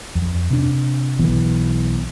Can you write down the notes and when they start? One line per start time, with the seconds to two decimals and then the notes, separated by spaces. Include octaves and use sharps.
0.15 F2
0.51 C3 D4
1.19 B1 E3 B3